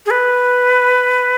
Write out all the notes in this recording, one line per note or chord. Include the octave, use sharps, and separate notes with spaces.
G#4
B4